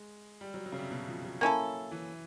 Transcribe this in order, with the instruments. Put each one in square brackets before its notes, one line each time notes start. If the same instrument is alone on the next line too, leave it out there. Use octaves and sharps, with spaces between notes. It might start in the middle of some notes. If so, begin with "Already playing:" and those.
Already playing: [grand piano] G#3
G3
F#3
F#3
C#3
C3
B2
F3
F#3
[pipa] A#3 C#4 E4 A4
[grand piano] E3